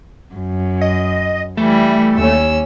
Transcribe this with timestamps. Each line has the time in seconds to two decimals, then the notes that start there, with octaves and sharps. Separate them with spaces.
0.34 F#2
0.81 D#5
1.57 E3 G3 A3
2.15 D#2 C#4 E6